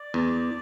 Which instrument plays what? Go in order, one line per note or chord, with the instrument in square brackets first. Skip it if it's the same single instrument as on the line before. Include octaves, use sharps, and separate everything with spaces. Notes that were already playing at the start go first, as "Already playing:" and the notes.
Already playing: [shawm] D5
[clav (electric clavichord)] E2